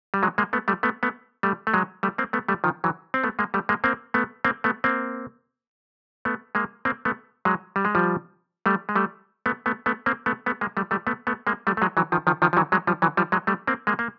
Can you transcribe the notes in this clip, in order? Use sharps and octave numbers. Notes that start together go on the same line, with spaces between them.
G3
F#3 G#3
G#3 A#3
A3 B3
G3 A3
A3 B3
A3 B3
G3 A3
A3
F#3 G#3
G3 A3
A#3 C4
A3 B3
G3 A3
D#3 F3
E3 F#3
C4
A3 B3
G#3 A#3
G3 A3
G#3 A#3
A#3 C4
A3 B3
A#3 C4
A3 B3
A#3 C4
A3 B3
G#3 A#3
A#3 C4
A3 B3
F#3 G#3
G3
G#3
F3 G3
G3 A3
G#3
G3 A3
A3 B3
A3 B3
A3 B3
A#3 C4
A3 B3
A3 B3
G#3 A#3
G3 A3
G3 A3
A3 B3
A3 B3
G#3 A#3
G3 A3
A3
F#3 G#3
E3 F#3
D#3 F3
D#3 F3
D#3 F3
F3
E3 F#3
F#3 G#3
F3 G3
E3 F#3
F3 G3
F#3 G#3
G3 A3
A#3 C4
G#3 A#3
A#3